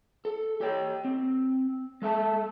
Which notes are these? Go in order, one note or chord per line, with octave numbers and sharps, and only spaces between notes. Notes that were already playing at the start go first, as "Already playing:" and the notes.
A4
G4 C#5 G5
C4
G#3 A4 E5 A5